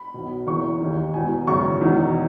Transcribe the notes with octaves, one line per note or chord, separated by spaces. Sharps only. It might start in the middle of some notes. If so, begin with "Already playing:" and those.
Already playing: B5
B1 B2
F#1 E2 C#3 E3 C#6
D#2 D#3
E1 E2 B2 G#5
G#1 F#2 C#3 E3 C#6
E1 E2 D#3